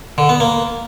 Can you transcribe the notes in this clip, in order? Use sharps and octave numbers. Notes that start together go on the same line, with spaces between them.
D3
B3
A#3